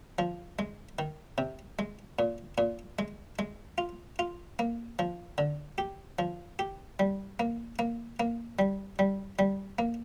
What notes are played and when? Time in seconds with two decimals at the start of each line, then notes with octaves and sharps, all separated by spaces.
0.19 F3
0.59 G#3
0.99 D#3
1.38 C3
1.79 G#3
2.19 A#2
2.58 A#2
2.99 G#3
3.39 G#3
3.78 F4
4.19 F4
4.59 A#3
4.99 F3
5.38 D3
5.78 G4
6.19 F3
6.59 G4
6.99 G3
7.40 A#3
7.79 A#3
8.20 A#3
8.59 G3
8.99 G3
9.39 G3
9.79 A#3